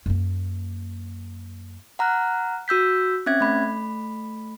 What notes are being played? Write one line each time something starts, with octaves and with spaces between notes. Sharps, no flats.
F#2 A#3
F#5 A#5 F6 F#6
F#4 E6 G6 B6
C4 C#4 E5 G#6
A3 B5